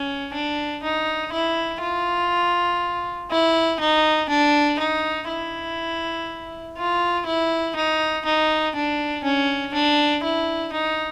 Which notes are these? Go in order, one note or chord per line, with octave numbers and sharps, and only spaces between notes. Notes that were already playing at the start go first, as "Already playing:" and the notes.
Already playing: C#4
D4
D#4
E4
F4
E4
D#4
D4
D#4
E4
F4
E4
D#4
D#4
D4
C#4
D4
E4
D#4